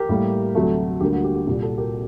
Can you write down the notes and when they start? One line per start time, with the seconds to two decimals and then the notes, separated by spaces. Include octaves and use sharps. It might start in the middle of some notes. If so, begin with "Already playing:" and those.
Already playing: G4 A#4
0.09 A2 G3 A#3
0.55 D2 C3 F#3 A3
1.01 D2 D3 G3 A#3 G4
1.13 F#4
1.24 G4
1.36 G4
1.47 C2 A#2 G3 G4
1.62 F#4 A4
1.78 G4 A#4